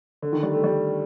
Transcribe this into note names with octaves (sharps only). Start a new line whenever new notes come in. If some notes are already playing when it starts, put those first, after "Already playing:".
D3
D#3
G3
A3
G3